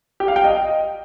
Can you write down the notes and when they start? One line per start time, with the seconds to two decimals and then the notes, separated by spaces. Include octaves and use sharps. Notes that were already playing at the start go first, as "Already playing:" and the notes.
0.20 G4
0.28 F5
0.36 G5
0.44 D#5